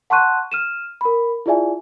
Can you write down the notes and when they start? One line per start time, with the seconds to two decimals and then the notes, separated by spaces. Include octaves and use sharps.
0.10 F#5 A5 C6 C#6 F#6 D#7
0.52 F6 D#7 E7
1.01 A#4 B5
1.46 E4 F4 G#4 D5 E5 G#5